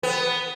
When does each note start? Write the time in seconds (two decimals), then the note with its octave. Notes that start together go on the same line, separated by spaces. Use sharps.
0.03 B3